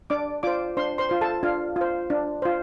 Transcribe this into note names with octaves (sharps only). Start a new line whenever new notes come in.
D4 D5 D6
F4 C5 D5 D6
D4 C5 C6
C5 C6
F4 C5
A4 A5
D4 F4 F5
F4 C5
D4
F4 C5